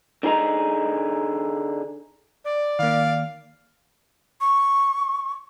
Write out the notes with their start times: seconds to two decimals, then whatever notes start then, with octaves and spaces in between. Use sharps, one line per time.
0.23 D3 D#4 G#4 D#5 A#5
2.45 D5
2.79 D#3 A#3 F5
4.41 C#6